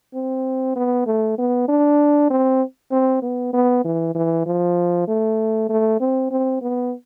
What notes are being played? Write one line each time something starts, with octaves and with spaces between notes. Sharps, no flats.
C4
B3
A3
B3
D4
C4
C4
B3
B3
E3
E3
F3
A3
A3
C4
C4
B3